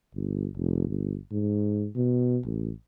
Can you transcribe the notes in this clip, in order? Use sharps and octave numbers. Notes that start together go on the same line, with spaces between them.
G1
F1
G1
G#2
B2
A1